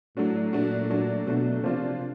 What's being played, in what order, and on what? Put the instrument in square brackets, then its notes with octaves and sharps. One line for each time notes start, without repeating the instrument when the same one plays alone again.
[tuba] A2 [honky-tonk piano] F#3 A3 D4 F#4
[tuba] A#2 [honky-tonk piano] F#3 A3 D4 F#4
[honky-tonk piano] F#3 A3 D4 F#4
[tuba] B2 [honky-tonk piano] F#3 A3 D4 F#4
[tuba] C3 [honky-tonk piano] F3 A#3 D4 F4